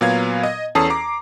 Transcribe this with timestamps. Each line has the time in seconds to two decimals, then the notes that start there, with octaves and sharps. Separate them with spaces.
0.01 A#2 F#3 B3 F5 G#6
0.43 D#5
0.75 E2 C#4 A4 A5 D#6 C7
0.90 A#5 D6